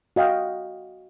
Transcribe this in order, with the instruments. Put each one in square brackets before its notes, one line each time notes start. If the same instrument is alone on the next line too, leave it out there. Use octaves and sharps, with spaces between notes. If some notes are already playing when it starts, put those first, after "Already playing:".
[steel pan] F#4 D#5 F5 G5